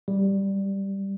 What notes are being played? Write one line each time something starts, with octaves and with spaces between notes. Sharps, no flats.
G3